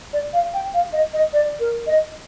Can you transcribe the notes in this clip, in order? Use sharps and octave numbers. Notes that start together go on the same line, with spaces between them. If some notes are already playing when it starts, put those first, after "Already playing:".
D5
F5
G5
F5
D#5
D#5
D5
A#4
D#5